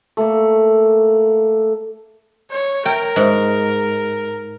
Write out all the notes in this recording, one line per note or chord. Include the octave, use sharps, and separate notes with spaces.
A3 A#3
C#5
A#4 G5
G#2